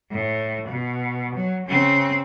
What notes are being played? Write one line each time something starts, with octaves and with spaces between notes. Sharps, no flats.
A2
B2
F#3
C#3 C4